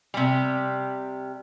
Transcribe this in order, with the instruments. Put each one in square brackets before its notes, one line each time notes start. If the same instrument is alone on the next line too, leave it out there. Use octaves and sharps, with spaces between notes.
[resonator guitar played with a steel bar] C3 G3